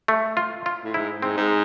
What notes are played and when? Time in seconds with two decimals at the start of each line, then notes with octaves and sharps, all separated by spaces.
0.08 A3
0.37 F4
0.66 F4
0.85 A2
0.94 G#2 E4
1.22 G#2 C4
1.37 G#2